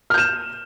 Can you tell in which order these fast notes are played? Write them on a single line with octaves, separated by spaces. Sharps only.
F6 G6 E7